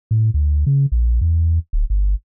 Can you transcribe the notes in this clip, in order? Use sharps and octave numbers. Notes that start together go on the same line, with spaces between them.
A2
D2
C#3
A#1
E2
D1
G1